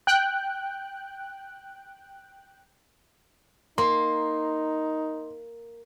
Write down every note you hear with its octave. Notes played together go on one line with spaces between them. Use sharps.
G5 F#6
A#3 D#4 C6